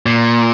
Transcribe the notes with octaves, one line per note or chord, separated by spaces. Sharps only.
A#2